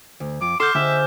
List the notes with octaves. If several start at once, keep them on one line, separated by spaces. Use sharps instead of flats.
D2
F2 D6
A4 F#5 C6 D6 F6 G6
D3 G#4 C5 D#5 E5